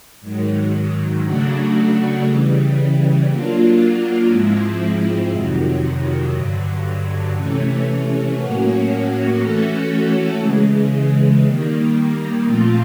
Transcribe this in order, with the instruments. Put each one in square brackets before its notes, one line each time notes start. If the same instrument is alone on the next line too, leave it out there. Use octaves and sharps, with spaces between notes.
[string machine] G#2 D#3 F#3
C#3 F#3 A3 D4 F#4
C#3 E3 G3
F#3 A#3 D4 F4
G#2 F3 G#3 C4 E4
F2 C3 D#3 F#3
G2 D3 F#3
C3 E3 A3 C#4
A2 F#3 A#3 C#4 F#4
E3 A3 C#4 F#4 A4
C#3 E3 G#3
D#3 G3 A#3
A#2 F3 A3 C4 F4